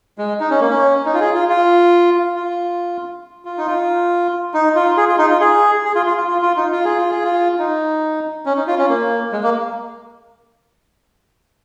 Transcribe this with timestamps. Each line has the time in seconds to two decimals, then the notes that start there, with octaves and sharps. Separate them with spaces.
0.18 G#3
0.40 D#4
0.50 C#4
0.60 A#3
0.70 C#4
1.06 D#4
1.14 F4
1.20 G#4
1.34 F4
1.49 F4
2.36 F4
3.45 F4
3.58 D#4
3.66 F4
4.54 D#4
4.75 F4
4.97 G#4
5.09 F4
5.18 D#4
5.30 F4
5.41 G#4
5.85 G#4
5.95 F4
6.06 F4
6.17 F4
6.28 F4
6.42 F4
6.57 D#4
6.72 F4
6.85 G#4
6.98 F4
7.10 G#4
7.24 F4
7.59 D#4
8.46 C#4
8.57 D#4
8.67 F4
8.78 C#4
8.89 A#3
9.32 G#3
9.43 A#3